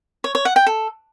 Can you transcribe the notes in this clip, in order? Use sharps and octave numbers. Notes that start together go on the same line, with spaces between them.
C#5
C#5
F#5
G5
A4